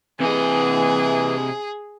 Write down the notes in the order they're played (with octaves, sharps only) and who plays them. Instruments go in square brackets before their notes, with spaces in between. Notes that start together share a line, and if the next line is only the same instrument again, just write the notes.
[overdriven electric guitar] C3 D#5 [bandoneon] E3 [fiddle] G#4